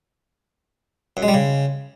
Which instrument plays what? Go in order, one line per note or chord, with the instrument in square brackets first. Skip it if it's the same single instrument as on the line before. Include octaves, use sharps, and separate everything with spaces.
[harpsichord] F#2
G#3
G3
C#3